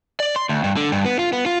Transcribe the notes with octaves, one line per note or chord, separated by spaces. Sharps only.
D5
C6
D2
G2
D3
G2
B3
F4
B3
F4